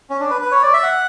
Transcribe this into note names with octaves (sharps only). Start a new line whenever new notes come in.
C#4
D4
B4
B4
C#5
D5
E5
F#5